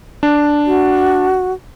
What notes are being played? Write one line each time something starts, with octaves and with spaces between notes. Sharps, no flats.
D4
F#4